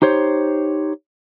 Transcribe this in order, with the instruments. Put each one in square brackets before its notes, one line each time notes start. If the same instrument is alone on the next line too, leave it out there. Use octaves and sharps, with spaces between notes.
[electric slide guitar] D#4 G4 C5 C#5